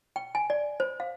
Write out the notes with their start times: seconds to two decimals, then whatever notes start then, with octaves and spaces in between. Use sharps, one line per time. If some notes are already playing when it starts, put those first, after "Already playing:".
0.16 G5
0.35 G#5
0.50 D5
0.80 C5
1.00 F5